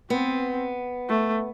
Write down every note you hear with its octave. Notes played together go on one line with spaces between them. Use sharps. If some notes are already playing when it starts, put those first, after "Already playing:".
B3 C4
A3